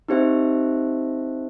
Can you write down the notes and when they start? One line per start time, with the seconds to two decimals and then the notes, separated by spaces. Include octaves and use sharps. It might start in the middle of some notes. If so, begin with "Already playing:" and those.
0.08 C4 D#4 G4 C5 E5